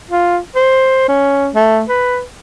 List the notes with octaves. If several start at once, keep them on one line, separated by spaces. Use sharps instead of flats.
F4
C5
C#4
A3
B4